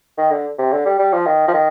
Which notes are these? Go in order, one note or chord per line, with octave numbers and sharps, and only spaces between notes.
D#3
D3
C3
D3
G3
G3
F3
D#3
F3
D#3